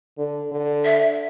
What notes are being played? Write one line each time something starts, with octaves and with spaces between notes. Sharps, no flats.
D3
D3
E5